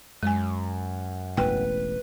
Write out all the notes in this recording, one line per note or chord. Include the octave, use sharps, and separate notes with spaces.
F#2 G#3 G#5
E1 A1 B4 G5